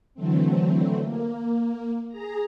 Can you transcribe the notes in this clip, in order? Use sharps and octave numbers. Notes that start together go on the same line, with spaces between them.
D3 E3 F#3 A3 C4
A#3
G#4 A#5